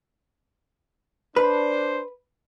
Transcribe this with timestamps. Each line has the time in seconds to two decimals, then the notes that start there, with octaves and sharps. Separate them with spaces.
1.36 D4 B4 C5